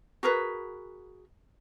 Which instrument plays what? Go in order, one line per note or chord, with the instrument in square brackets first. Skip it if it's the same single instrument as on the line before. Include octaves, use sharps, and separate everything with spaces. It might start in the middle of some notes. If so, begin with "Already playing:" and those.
[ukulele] F#4 G#4 A#4 B4